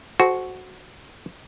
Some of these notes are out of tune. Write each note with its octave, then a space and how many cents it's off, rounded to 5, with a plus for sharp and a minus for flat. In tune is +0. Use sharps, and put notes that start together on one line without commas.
F#4 +0 A4 -40 C5 +0